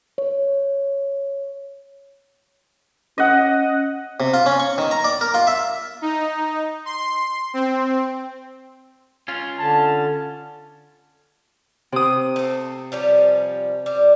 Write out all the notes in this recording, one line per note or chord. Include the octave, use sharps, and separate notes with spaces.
C#5
C#4 D#5 F#5
C3
F4
C#4
C#6
D#3
A#5
D5
A#4
F4
E5
D#4
C6
C4
C#4 F4
D3 A5
C3 D#6
A3 C4
F3 G3 C#4
G3